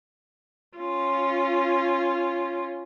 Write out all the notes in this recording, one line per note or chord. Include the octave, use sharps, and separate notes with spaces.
C#4 F4